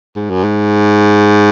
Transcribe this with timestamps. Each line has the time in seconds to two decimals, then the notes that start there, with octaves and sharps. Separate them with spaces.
0.16 G#2
0.30 F#2
0.44 G#2